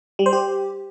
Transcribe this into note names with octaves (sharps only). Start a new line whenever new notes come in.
G3
C5
G4